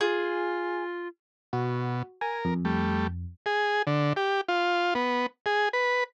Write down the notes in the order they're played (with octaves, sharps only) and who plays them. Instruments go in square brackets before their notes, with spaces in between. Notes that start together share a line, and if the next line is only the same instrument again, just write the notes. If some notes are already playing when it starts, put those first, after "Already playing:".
[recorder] F4 [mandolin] G#4
[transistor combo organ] B2 [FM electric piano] F#4
[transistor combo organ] A#4 [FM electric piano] G#5
[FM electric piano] F2
[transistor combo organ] G3 A3
G#4
D3
G4
F4
B3
G#4
B4